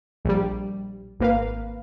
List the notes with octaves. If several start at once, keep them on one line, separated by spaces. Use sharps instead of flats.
A#1 G3
G#1 A#3 B4 F5